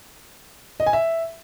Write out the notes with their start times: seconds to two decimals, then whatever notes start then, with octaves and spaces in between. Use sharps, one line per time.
0.80 D#5
0.86 G#5
0.93 E5